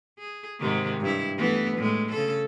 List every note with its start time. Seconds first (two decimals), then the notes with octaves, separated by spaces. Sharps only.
0.19 G#4
0.60 G#2 C3 D#3
1.01 G2 E4
1.37 E3 A3 B3
1.77 A2 G#3
2.12 C#3 A4